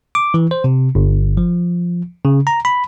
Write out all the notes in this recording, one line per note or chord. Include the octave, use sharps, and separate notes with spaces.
D6
E3
C5
C3
G1
F3
C#3
A#5
B5